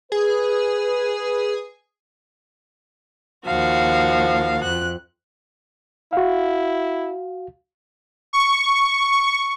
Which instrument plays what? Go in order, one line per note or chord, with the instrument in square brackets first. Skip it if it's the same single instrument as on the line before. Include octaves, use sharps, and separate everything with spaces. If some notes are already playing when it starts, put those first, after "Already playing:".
[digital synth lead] G#4 [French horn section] B4
[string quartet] D#2 F3 F#4 F5
F2 F#6
[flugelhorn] E4 [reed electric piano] F#4 F5
[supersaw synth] C#6